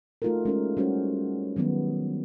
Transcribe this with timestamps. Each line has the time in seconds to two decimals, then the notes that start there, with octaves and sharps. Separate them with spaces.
0.22 A3 D#4 F4 F#4 A4 A#4
0.45 G#3 C#4 A#4
0.77 G3 C#4 F#4 C5
1.56 D#3 F#3 G3 B3